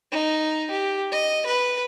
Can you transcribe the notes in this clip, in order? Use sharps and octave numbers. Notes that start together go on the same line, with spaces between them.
D#4
G4
D#5
B4